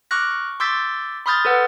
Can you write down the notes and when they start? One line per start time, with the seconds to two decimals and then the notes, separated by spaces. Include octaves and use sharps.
0.11 C#6 D6 F6 F#6 A#6
0.31 C#6
0.60 C6 D6 E6 G6 A6 B6
1.26 B5 C6 D#6 F6 G6 A6
1.45 A4 B4 F#5